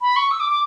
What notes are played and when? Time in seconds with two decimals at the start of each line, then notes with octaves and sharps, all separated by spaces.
0.01 B5
0.16 C#6
0.31 E6
0.40 D6
0.50 D6